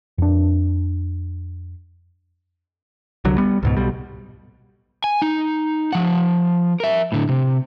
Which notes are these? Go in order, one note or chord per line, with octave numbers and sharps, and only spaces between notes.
F2 D4
C2 D3 F#3
G3 B3
C#2 G#2 B2
B1 B2 G3
G#5
D#4
F3 F#5
A#4 E5
A2 D3
C3